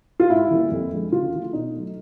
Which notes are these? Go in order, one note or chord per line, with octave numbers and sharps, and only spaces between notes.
F4
G#2 E4
E3 G3 A#3
F2
D3 F3 G#3
C#3 F4
E3 A3
B2 D#4
F#3 A3